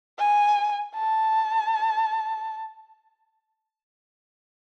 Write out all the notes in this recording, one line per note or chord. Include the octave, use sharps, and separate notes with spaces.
G#5
A5